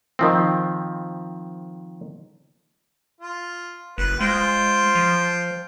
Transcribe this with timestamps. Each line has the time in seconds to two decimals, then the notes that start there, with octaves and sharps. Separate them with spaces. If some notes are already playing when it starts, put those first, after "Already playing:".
0.19 D#3 F3 C4
3.21 F4
3.98 F#1 B4
4.20 G#3 F4 C5 G5
4.95 F3